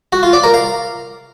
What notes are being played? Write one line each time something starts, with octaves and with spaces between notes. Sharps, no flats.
F#4
F4
D5
A#4
F5